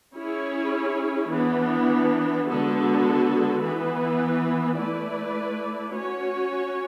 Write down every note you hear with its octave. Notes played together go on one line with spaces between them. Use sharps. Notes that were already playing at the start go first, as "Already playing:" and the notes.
C#4 E4 G#4 C#5
E3 B3 D4
D3 G#3 B3 F#4 A4
E3 B3 E4 B4
A3 E4 B4 D5
C#4 F#4 C#5